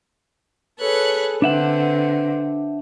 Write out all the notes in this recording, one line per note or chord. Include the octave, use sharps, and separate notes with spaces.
G#4 A4 B4 C#5 F#6
D3 C4 D4 B4 E5 F#5